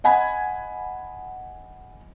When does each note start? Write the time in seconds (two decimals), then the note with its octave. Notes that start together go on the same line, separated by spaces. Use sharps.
0.04 D#5 F#5 G#5 B5 G#6